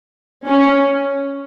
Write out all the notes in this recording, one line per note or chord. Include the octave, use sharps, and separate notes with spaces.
C#4